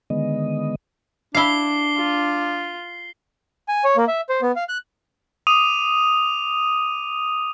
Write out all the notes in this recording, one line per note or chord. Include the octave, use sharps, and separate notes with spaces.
D3 D#3 G#3 B3 D#5
D4 E4 F5 C7 G7
F4
G#5
C#5
A#3
E5
C5
B3
F5
F#6
D6 D#6 D#7 F7